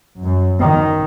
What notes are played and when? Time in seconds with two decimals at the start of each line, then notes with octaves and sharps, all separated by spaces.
0.19 F#2
0.60 D#3